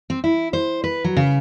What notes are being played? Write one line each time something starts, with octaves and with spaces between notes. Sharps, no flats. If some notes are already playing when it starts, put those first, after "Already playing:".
C4
E4
C5
B4
F#3
C#3